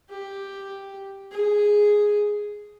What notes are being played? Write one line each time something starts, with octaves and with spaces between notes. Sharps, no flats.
G4
G#4